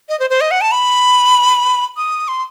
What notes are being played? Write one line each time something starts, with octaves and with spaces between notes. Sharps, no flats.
D#5
C5
C5
D#5
F#5
A5
B5
D#6
C6